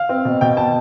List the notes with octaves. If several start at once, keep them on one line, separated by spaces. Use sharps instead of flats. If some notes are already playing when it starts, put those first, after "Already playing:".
Already playing: F5
C4
B2
B2 G5
B2 A5